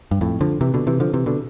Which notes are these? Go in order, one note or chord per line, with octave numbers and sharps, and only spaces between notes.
G2
F2 A2
D3 F3
C3 E3
B2 D3
C3 E3
D3 F3
C3 E3
B2 D3